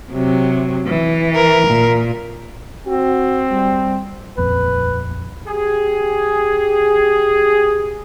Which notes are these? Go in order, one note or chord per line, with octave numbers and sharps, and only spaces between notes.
C3 F#3
E3
A#4
A#2
C4 F#4
G3
D#1 A#1 F2 B4
G4 G#4